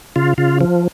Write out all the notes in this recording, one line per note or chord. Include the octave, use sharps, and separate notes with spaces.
C#3 F4
C#3 F4
F3